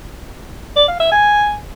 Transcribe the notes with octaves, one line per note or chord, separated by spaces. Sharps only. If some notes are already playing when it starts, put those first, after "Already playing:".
D5
F5
E5
G#5